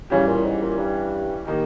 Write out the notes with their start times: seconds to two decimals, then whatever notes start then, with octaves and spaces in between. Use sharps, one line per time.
0.10 C#3 E3 G3 C#4 G4
0.27 A#2
0.44 G#2
0.62 A#2
0.78 G2
1.45 D#3 A#3 D#4 G4